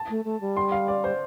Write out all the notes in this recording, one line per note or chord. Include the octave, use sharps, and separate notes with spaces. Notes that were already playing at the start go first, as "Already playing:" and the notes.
Already playing: A5
A3
A3
G3
C6
F5
D5
C5